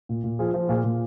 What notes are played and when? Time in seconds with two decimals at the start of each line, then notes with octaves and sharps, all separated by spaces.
0.09 A#2
0.24 A#2
0.39 F3 F4 G#4
0.54 F3
0.69 A#2 F4 G#4
0.84 A#2